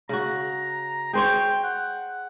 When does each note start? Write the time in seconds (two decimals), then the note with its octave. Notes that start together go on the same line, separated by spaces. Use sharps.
0.09 C#3 F#4 A#5
1.13 G#4 C5 C#5 G5
1.64 F#5